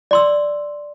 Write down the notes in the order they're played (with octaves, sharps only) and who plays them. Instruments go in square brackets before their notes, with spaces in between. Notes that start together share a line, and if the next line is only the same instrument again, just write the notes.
[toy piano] D5 C6 E6